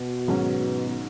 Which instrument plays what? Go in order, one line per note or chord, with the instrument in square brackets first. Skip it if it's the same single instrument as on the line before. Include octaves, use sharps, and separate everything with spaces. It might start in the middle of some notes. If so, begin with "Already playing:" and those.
Already playing: [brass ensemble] B2
[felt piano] G#2 D#3 F#3 C#4